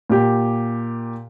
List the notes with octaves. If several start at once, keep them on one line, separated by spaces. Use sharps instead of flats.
A#2 G4